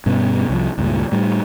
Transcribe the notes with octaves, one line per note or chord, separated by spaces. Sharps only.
G2 B2 C#4
C2 F3
C#2 G2 A#2
A2 G3